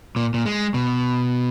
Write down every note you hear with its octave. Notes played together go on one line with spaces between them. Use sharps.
A#2
A#2
G#3
B2